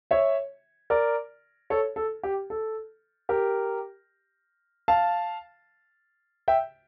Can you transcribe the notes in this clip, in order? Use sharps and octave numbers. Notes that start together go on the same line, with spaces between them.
C#5 E5
A#4 D5
A4 C#5
A4
G4
A4
G4 A#4
F5 A5
E5 G5